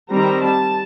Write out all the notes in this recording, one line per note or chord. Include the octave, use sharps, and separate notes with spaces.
D#3 G3 C4 A#5
A5